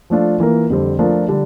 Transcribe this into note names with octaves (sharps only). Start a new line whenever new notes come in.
F3 A3 D4 F4
E3 A#3 F4 A#4
F2 D3 G3 C4
F3 A3 D4 F4 A#4
D3 G3 D4